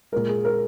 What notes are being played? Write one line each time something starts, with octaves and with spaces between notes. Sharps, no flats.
A#2 G#3 A#4
G#4
A#4